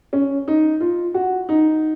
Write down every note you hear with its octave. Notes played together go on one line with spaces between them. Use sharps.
C#4
D#4
F4
F#4
D#4